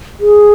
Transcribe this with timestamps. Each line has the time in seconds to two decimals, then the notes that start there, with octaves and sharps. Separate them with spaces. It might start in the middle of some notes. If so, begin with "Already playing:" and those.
0.20 G#4